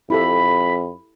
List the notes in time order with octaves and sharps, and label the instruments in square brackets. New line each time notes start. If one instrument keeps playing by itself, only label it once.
[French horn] F2 [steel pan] E4 G4 A4 [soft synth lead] B5